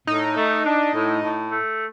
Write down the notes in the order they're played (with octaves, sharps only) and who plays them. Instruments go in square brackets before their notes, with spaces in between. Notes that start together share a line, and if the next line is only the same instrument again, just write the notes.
[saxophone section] A2 [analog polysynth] D#4
[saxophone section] A3
D4
A2
A2
A3